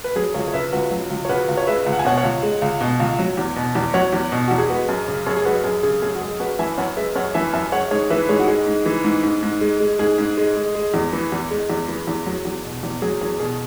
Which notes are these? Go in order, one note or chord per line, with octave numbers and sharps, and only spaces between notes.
B4
F#3 G#4
C#2 G#4 C#5
C#5
C#3 B4 E5
C#2 F#4 B4
F#3
C#2
C#5
C#3 F#4 B4
C#2
C#5
G#3 B4 E5
C#2
F#5
G#5
B2 C#5 F#5
C#5 F#5
C#2
G#3
C#2
B2
C#2
F#3
E2
B2
E2
F#3 C#5 F#5
E2
B2
E2 F#4
G#4
G#3 F#4 B4
F#2
C#3
F#2 G#4 C#5
G#4
G#3 F#4 B4
F#2 G#4
C#3 G#4
F#2 G#4
F#4
G#3 G#4
F#2 F#4 B4
E3 E5 G#5
F#2 C#5 F#5
G#3 B4 E5
F#2 C#5 F#5
E3 E5 G#5
F#2 E5 G#5
G#3 C#5 F#5
G#2 G#4 C#5
E3 B4 E5
G#2 G#4 C#5
F#4
G#3 G#4
G#2
E3
G#2
G#2
G#2
G#3
G#3
G#2 G#4
G#2
G#3
G#3
G#3
E2
E3
E2
G#3
E2
E3
E2
F#3
E2
B2
E2
F#3 G#4
E2 G#4
B2 G#4